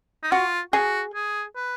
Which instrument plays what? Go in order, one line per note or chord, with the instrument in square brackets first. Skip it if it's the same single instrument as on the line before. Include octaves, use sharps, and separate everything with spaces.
[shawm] D#4
[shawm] F4 [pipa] F#4
[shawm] F#4 [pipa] G#4
[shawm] G#4
B4